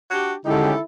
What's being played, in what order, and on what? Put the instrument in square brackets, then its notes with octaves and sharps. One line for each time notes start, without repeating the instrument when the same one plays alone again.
[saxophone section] D4 F#4 G4
[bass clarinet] D3 [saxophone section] D#3 D#4 A4 [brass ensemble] G#3 C#4 G4 [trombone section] E4